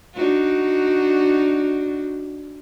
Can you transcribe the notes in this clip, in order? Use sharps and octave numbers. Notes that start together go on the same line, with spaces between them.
D4 D#4 F#4